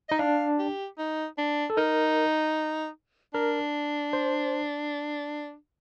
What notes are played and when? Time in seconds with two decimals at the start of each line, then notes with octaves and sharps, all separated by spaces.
0.09 D#4 D#5
0.19 D4 F5
0.59 G4
0.98 D#4
1.38 D4
1.70 A4
1.77 D#4 A#4
3.34 D4 A#4
4.13 C5